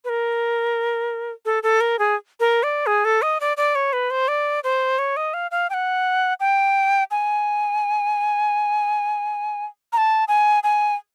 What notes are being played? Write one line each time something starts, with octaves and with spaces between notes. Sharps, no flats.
B4
A#4
A4
A4
A#4
G#4
A#4
D5
G#4
A4
D#5
D5
D5
C#5
B4
C5
D5
C5
C#5
D#5
F5
F5
G5
F#5
G5
G#5
A#5
A5
G#5
G#5